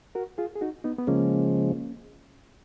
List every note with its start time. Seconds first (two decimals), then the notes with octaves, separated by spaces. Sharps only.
0.15 F#4 A#4
0.38 F4 G#4
0.55 G#4
0.61 D#4 F#4
0.84 B3 D#4
0.98 B3
1.07 C#3 F3 G#3 A#3 C#4